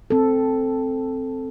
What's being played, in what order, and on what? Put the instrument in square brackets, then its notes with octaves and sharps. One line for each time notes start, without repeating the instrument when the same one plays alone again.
[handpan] C4 A4